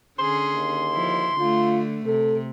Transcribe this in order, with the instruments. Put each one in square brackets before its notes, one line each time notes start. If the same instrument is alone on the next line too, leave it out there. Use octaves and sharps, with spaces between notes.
[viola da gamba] D3 C#4 G#4 [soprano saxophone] C6
[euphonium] D#2
[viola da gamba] F3 E4
[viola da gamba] D3 A3 [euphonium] F4
[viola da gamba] C3 [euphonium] A4